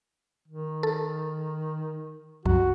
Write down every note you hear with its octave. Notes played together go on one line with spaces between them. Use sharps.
D#3
A4
C2 F#2 F#4